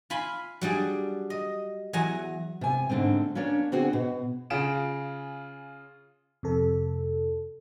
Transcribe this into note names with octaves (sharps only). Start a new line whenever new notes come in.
F4 G#5 B5 C6
F#3 G3 D4 G#4
D#5
E2 F#3 G#5 A#5
C3 G#5
G#2 D3 A3 C4
A#3 C#4 D4 C#5
D3 C4 F#4 G#4 F#5
B2
C#3 F4 G#4 D7 E7
F2 C3 A4